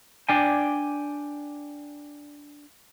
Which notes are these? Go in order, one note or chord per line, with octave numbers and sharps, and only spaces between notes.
D4 D5 G5 G#5